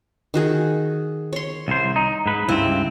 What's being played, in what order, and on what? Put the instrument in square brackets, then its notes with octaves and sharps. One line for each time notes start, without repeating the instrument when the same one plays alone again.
[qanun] D#3 F#4 G#4
C#5 C6
[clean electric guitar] C2 C5
D#4
G#2 B4
[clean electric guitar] C#2 G2 C4 [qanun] E4